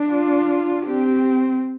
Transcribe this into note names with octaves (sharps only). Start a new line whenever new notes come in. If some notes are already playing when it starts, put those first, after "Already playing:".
Already playing: D4
F4
C4 G4